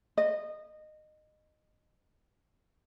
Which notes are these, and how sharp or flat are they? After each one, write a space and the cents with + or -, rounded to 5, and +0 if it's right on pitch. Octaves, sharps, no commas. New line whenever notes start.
D#5 -20